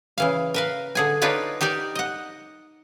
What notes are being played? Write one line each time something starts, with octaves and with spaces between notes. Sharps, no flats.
C#3 E3 F5
A#4 B4 F5
D3 G#4 G#5
D4 D#4 F4 B4 C#5 D5
D#4 G4 A#4 D5
D#5 F#5